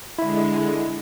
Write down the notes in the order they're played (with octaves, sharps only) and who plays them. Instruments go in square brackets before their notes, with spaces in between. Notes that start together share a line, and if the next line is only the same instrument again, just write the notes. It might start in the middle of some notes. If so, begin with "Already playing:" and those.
[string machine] D3 G#3 [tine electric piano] E4